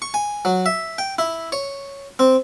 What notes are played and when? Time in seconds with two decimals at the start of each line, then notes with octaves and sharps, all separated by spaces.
0.02 C#6
0.14 G#5
0.45 F#3
0.66 E5
0.98 G5
1.19 E4
1.52 C#5
2.19 C4